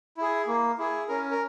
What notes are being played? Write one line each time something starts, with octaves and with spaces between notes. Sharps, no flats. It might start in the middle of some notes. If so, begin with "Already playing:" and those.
E4 G#4
A#3
E4 G#4
C#4 A#4
A#4